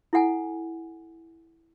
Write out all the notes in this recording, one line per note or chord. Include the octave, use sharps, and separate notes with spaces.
E4 A4 F#5 G#5